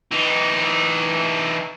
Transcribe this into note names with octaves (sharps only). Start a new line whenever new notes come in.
E3 D#4